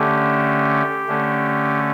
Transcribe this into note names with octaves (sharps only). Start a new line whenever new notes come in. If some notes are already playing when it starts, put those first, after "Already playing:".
Already playing: D3 A3 C#4 G4
D3 A3 C#4